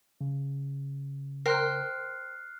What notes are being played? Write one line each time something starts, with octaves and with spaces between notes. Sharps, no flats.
C#3
A#4 C5 G5 F6 F#6 C7